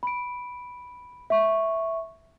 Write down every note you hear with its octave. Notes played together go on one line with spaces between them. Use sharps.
B5 D7
E5 C#6